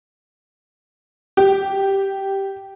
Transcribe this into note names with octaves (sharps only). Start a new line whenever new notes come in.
G4